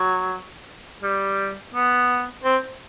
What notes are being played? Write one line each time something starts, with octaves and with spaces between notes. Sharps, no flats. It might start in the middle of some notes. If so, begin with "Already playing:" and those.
Already playing: F#3
G3
B3
C4